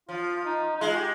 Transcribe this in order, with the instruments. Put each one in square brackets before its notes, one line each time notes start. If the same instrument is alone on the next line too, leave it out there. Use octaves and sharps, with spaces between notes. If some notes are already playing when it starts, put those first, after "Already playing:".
[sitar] F3 [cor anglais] F4
[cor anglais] F4
D#4
D#4
[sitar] G#3 [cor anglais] F4
[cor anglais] G4